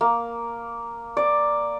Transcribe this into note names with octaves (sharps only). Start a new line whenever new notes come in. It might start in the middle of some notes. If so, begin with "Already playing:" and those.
A#3
D5